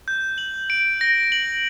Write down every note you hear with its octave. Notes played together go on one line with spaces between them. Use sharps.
G6
F#7
D7
A#6
F#7